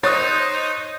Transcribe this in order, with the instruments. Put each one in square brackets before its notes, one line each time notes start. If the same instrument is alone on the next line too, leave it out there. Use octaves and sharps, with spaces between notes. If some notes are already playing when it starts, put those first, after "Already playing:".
[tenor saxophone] D#4 [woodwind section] C5 [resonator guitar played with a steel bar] C#5 [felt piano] D#6 F#6 A6